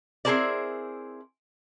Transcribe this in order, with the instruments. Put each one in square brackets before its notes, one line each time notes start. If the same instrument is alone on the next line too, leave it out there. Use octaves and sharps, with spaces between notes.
[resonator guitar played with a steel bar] C4 E4 G#4 A#4 C5 D5